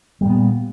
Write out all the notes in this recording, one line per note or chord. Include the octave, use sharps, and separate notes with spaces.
A#2 G3 B3